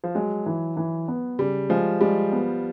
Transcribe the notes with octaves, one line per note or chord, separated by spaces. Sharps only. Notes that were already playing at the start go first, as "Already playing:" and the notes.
F3
F#3 G#3
E3
E3
B3
C#3 G3
F3 G#3
G3 G#3
B3